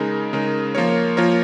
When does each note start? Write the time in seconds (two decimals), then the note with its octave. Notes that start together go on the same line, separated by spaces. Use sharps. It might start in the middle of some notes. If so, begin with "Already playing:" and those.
Already playing: C#3 G#3 D#4 A#4
0.33 C#3 G#3 D#4 A#4
0.75 F3 A#3 F4 A#4 C#5
1.17 F3 A#3 F4 A#4 C#5